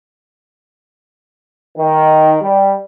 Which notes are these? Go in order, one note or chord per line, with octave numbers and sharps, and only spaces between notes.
D#3
G3